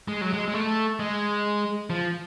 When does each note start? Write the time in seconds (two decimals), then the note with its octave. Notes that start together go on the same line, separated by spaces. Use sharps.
0.08 G#3
0.21 F#3
0.33 G#3
0.48 G#3
0.54 A3
0.99 G#3
1.90 F3